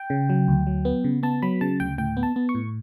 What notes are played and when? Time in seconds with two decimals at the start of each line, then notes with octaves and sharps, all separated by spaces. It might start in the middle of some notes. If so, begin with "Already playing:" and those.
Already playing: G5
0.10 C#3
0.30 F#3
0.48 D2
0.67 F#3
0.85 B3
1.04 C#3
1.23 B3 A5
1.42 F#3 B5
1.61 C#3 A5
1.80 D2 G5
1.98 A2 G5
2.17 B3
2.23 A5
2.36 B3
2.49 C#6
2.55 A2